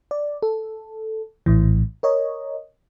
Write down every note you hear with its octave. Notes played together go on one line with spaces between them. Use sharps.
D5
A4
A#1 A2 E3
A#4 C#5 D#5